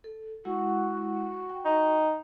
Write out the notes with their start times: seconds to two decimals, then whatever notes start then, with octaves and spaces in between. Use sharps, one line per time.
0.04 A4
0.45 G#3 E4 F#4 F#5
1.50 G5
1.65 D#4